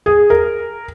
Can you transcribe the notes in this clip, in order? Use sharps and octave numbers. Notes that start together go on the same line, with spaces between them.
G#4
A#4